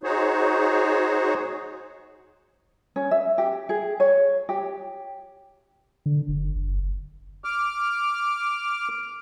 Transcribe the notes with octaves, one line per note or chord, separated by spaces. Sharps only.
D#4 F#4 G#4 C5 C#5
C#4
E5
G4
G#4
C#5
G4
D3
F#1
F#1
D6 F6